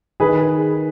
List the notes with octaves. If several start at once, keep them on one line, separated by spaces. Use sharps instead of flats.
D#3 G#4 B4